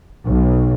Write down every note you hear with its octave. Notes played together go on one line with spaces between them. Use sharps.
B1